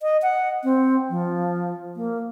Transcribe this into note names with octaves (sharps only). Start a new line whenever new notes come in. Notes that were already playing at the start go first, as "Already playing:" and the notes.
D#5
F#5
C4
F3
A#3